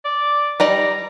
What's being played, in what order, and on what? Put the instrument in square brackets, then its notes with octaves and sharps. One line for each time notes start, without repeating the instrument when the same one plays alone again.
[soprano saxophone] D5
[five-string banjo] G3 D#4 D5 [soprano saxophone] A#5